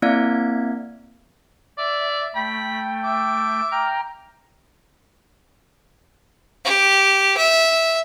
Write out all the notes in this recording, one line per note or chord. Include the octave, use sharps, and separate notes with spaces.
A#3 C4 E4 D5 F5 G#6
D5 E5
A3 G5 B5
E5 D6
G5 A#5 F6
G4
E5